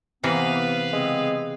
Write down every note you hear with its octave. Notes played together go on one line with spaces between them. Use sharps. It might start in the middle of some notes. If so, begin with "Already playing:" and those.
C3 E3 A#3 B3 B4 F5
C#3 G#3 B3 C4